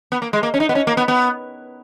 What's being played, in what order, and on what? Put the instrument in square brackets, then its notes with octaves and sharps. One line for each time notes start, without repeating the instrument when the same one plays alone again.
[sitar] B3
A#3
G#3
A#3
C#4
D#4
B3
C#4
A#3
B3
B3